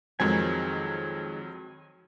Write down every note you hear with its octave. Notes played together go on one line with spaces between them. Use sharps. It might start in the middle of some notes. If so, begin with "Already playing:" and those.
F2 D#3 F#3 G#3 C4 G#5